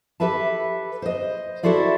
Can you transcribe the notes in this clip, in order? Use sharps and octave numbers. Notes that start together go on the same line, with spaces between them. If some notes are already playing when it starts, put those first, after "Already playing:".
G4 A4 B4 E5 A5
C5 D#5
E4 F#4 A4 C5 D5 E5